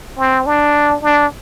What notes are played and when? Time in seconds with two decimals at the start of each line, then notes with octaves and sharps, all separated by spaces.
0.18 C4
0.46 D4
1.03 D4